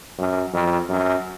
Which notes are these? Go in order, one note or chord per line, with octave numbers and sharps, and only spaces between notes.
F#2
F2
F#2